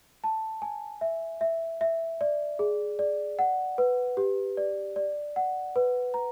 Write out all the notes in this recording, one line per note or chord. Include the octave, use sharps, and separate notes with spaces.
A5
G#5
E5
E5
E5
D5
G#4
D5
F#5
B4
G4
D5
D5
F#5
B4
A#5